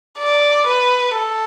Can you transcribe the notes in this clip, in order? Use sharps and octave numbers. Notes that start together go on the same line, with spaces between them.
D5
B4
A4